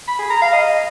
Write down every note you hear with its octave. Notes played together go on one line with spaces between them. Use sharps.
B5
G#4
A#5
F5
D#5